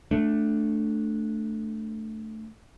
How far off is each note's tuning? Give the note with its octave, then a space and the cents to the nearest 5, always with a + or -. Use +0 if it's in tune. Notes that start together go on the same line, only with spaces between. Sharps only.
A3 +0 D4 +0